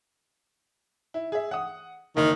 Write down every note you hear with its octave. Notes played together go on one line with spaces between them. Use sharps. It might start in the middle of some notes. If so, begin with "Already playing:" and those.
E4
G#4 E5
F#5 D#6
F#1 D#3